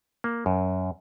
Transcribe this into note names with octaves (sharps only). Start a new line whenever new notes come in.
A#3
F#2